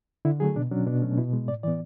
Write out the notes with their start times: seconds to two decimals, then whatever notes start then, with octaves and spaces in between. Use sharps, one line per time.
0.25 D3 E4
0.40 F#3 A3 G#4
0.56 B2 D4
0.71 F#3 C#4 D4
0.87 B2 D4
1.02 F#3 A3 C#4
1.17 B2 E4
1.33 G#3 B3
1.48 A2 D5
1.63 E3 B3 D5